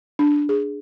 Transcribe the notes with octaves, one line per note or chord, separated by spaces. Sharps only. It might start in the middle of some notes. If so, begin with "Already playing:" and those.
D4
G#4